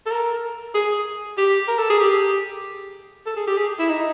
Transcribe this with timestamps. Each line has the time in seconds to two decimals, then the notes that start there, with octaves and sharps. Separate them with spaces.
0.06 A4
0.11 A#4
0.74 G#4
1.38 G4
1.68 A#4
1.78 A4
1.90 G#4
2.01 G4
3.27 A4
3.37 G#4
3.47 G4
3.57 G#4
3.79 E4
3.89 D#4